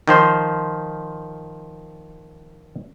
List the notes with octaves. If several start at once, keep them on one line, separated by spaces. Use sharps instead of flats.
D#3 F3 C5